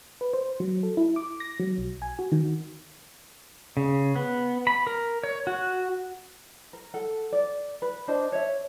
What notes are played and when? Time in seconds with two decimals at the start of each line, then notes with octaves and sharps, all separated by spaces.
0.21 B4
0.33 C5
0.60 F#3
0.83 A4
0.97 E4
1.16 D6
1.40 A#6
1.60 F#3
1.78 B1
2.02 G#5
2.19 F#4
2.32 D#3
3.77 C#3
4.16 B3
4.67 B5
4.87 A#4
5.23 C#5
5.47 F#4
6.73 A#4
6.94 A4 F#5
7.33 D5
7.82 B4
8.08 D4 C5 D#5 A5
8.32 C#5 E5